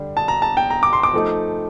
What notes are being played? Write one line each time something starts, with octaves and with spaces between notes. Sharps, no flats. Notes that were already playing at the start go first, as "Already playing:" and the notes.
Already playing: D3 G3 D4
A5
A#5
A5
G5
A#5
D6
C6
D6
F3 A3 D#4